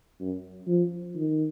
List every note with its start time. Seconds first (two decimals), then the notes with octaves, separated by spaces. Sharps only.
0.21 F#2
0.67 F3
1.16 D#3